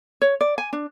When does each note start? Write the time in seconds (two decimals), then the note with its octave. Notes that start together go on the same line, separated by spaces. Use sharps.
0.22 C#5
0.41 D5
0.58 G#5
0.73 D4